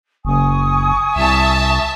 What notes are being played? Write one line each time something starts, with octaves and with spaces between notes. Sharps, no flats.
F#1 G#5 C#6 D#6
C2 E5 A5